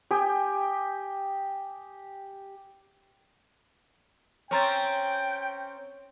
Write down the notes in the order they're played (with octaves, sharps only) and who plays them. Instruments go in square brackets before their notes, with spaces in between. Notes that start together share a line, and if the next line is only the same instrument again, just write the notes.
[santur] G4 G5 G#5 D#6
[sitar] C4 C#4 [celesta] C#5 A#5 A6 [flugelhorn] G5